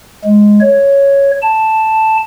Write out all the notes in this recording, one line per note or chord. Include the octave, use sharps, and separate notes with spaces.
G#3
C#5
A5